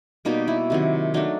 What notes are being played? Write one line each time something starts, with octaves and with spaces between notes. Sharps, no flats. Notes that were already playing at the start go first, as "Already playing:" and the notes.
B2 G3 A#3 D#4
E4
C3 D#3 F#3
F#3 A3 D4 D#4